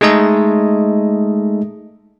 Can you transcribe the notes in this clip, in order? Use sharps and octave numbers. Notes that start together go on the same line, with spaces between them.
G#3 A3 D#4 A4 D#5